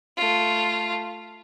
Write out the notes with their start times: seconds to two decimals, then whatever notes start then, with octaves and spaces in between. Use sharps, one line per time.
0.17 A3 F4